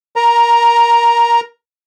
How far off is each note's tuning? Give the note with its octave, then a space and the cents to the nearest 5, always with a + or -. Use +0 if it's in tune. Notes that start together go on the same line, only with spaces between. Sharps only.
A#4 +15 A#5 +0